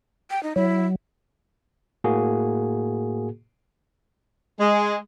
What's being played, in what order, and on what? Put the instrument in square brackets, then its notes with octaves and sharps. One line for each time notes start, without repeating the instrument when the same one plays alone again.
[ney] G5
D#4
[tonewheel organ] F#3 [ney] E4
[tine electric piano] A2 A#3 F#4 G#4
[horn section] G#3